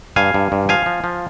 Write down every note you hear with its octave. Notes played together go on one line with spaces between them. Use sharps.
G2 F5 G#5
G2
G2
F3 F5 G#5
F3
F3